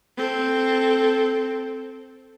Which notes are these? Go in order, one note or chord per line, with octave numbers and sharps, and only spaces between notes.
C4 A4